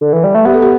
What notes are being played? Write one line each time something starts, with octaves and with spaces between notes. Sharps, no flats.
D3
E3
G3
A3
B3 G4
A4
G4